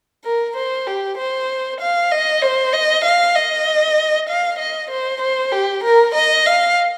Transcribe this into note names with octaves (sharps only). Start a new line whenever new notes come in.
A#4
C5
G4
C5
F5
D#5
C5
D#5
F5
D#5
F5
D#5
C5
C5
G4
A#4
D#5
F5